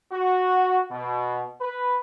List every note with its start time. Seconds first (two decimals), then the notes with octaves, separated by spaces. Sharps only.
0.13 F#4
0.90 B2
1.61 B4